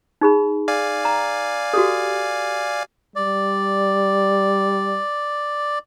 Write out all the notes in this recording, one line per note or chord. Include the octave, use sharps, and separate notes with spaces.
D#4 G#4 B5
D5 F5 G#5
A#5
F#4 G4 A4
G3 D5